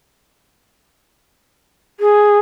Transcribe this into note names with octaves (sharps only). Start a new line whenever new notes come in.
G#4